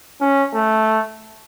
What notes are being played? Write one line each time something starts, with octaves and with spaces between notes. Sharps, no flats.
C#4
A3